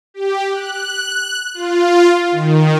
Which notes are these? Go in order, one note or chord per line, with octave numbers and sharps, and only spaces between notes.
G4
F#6
F4
D#3